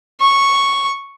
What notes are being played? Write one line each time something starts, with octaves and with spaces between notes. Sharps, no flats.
C#6